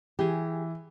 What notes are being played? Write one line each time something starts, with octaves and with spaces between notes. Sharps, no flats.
E3 G4 G#4